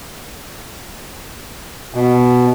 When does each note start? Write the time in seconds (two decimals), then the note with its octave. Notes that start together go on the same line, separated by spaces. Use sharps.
1.95 B2